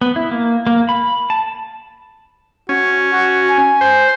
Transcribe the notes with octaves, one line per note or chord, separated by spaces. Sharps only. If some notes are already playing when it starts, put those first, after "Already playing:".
B3
E4
A#3
A#3
B5
A5
C#4 F#4
F#4
G#5
C5